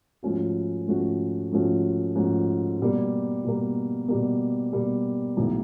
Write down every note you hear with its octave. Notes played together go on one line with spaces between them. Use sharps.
G#2 F3 A3 C#4 F#4
G#2 F3 A3 C#4 F#4
G#2 F3 A3 C#4 F#4
G#2 F3 A3 C#4 F#4
B2 G3 A#3
B2 G3 A#3
B2 G3 A#3
B2 G3 A#3
B1 A2 E3 G#3